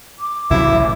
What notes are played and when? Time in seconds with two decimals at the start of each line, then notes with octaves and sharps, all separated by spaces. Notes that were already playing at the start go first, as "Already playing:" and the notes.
0.19 D6
0.51 C#2 C3 F#3 E4 E5
0.63 A1